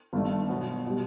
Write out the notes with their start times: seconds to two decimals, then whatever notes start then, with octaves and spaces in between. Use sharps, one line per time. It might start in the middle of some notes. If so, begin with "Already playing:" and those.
0.13 G1 G2 D#3 A3
0.49 B2 F#3 B3
0.87 B2 G3